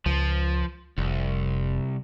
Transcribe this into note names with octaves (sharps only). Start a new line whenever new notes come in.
C#2 F3
F1 C2